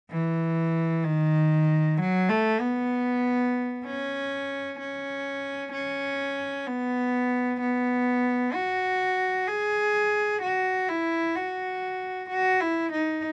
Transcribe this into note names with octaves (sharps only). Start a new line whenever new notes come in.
E3
D#3
F#3
A3
B3
C#4
C#4
C#4
B3
B3
F#4
G#4
F#4
E4
F#4
F#4
E4
D#4